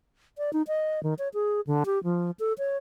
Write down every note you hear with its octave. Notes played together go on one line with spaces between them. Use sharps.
D5
D#4
D#5
D#3
C#5
G#4
D3
G4
F3
A4
C#5